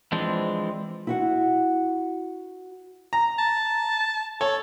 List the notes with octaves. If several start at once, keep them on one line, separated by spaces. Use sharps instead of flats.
E3 F3 G#3 C4 D4
E4 F#4 F#5
A#5
A5
A4 C#5